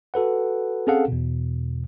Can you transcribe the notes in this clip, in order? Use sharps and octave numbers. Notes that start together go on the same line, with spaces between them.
F#4 A4 B4 F#5
C4 C#4 G#4 A4 F5 F#5
E2 B2